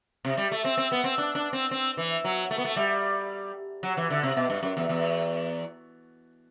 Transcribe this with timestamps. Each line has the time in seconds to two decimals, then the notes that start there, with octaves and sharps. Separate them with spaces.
0.25 C3
0.37 G3
0.52 A3
0.65 C4
0.78 C4
0.92 B3
1.04 C4
1.18 D4
1.35 D4
1.53 C4
1.71 C4
1.97 E3
2.24 F#3
2.51 A3
2.58 B3
2.65 A3
2.76 G3
3.83 F#3
3.97 E3
4.10 D3
4.23 C3
4.37 B2
4.50 G2
4.63 F#2
4.77 E2
4.89 E2